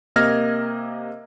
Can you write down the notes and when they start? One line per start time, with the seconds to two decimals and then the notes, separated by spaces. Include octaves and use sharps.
0.16 C3 A#3 D#5 F6 G#6 A#6